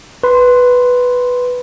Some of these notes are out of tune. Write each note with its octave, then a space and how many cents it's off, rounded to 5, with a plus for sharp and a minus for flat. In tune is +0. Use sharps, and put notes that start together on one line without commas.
B4 +0 C6 +0